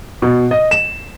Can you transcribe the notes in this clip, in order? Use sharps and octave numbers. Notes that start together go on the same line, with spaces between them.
B2
D#5
E7